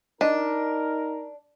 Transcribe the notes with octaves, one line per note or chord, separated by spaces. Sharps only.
D4 D#4 A#4 D#5